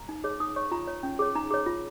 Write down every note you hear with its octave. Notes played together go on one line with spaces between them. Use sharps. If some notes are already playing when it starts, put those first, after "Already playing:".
Already playing: A#5
D#4
G#4 C#5
D#4 D#6
C#5 C#6
F4 A#5
C#5
C#4
G#4 C#5
D#4 A#5
G#4 C#5
F4